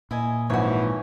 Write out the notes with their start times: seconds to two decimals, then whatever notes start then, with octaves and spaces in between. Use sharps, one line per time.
0.11 A#2 E4 D#5 G#5
0.50 G#1 E3 F3 F#4 C#5